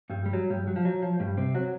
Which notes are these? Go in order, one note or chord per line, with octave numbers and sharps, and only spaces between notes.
G2 G3
G3
F#3
G2 G3
F#3
F3
F#3
F3
G2 G3
C3 C4
F#3 F#4